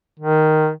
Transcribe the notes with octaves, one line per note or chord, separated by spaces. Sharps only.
D#3